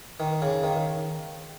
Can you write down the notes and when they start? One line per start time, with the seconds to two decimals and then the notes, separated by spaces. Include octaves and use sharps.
0.20 D#3
0.42 C#3
0.64 D#3